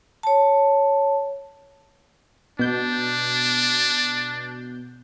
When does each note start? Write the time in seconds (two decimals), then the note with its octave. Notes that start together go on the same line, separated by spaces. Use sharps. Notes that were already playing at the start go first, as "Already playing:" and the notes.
0.23 C#5 A5
2.59 B2 D4 G6